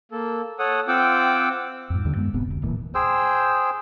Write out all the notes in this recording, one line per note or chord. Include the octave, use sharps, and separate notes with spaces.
A#3 A4
A4 C#5 F#5 D#6
C4 F4 F#5 G5 D6 E6
F2 G#2
D#2 D3 G3
F#2 G#3 B3
D1 G1 C3 B3
F1 D2
D1 A#2 E3
G#4 C5 G5 E6